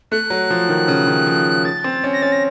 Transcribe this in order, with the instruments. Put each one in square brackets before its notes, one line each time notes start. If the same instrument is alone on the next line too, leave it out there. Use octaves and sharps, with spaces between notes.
[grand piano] A3 [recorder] F#6
[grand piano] F#3
F3
D#3
C#3
D#3
F3
[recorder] A6
[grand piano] C4
C#4
[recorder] A#6
[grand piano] C#4 [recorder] A6
[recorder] A#6